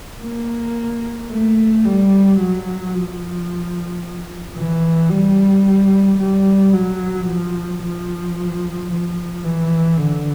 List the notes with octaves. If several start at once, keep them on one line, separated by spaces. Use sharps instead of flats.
A#3
A3
G3
F#3
F3
E3
G3
G3
F#3
F3
F3
F3
E3
D3